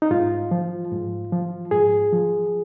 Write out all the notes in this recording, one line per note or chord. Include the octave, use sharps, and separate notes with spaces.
D#4
G#2 F4
F3
G#2
F3
G#2 G#4
F3